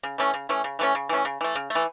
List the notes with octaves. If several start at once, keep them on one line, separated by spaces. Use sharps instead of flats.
C#3
E3 A3 C#4
C#3
E3 A3 C#4
C#3
E3 A3 C#4
C#3
E3 A3 C#4
C#3
E3 A3
C#3
A3
E3